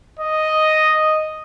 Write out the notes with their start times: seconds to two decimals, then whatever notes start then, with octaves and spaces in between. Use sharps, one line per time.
0.19 D#5